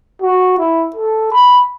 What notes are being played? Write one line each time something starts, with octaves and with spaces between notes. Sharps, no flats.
F#4
E4
A4
B5